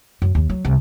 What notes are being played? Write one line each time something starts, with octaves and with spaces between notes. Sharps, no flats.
F#2
D#2
F#3
C2